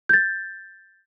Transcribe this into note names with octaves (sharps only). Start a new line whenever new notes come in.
G6 A6